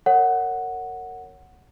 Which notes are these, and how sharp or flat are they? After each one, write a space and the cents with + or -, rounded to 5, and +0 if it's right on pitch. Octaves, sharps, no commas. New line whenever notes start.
A#4 -25 C#5 +0 F#5 +0